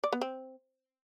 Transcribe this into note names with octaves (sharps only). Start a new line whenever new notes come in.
D5
B3
C4